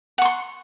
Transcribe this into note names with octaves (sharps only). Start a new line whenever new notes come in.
F#5 C6 C#6